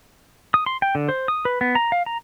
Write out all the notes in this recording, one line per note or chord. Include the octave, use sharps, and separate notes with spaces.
D#6
C6
G5
D3
C5
D#6
B4
B3
A#5
F5
A#5